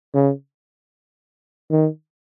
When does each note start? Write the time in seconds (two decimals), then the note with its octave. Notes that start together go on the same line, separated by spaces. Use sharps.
0.14 C#3
1.71 D#3